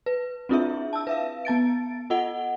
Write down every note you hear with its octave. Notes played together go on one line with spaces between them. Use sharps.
B4
C4 D4 E4 F4 G#4 E5
A5 E6
B4 E5 F5
B3 A5 A6 D7
F4 A4 D#5 F#5 G7